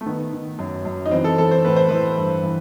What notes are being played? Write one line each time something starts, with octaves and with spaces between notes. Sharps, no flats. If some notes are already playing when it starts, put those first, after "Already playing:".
A3
D#3 B3
D#3
F#2
F#2
D#4
E3 C4
A4
E3 A4
C5
A2 B4
C5
E3 B4
G2
E3